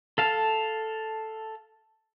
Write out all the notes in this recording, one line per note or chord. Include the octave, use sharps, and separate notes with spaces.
A4 F5 A5